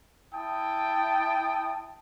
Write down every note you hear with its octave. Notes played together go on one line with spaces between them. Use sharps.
E4 G5 A5 D#6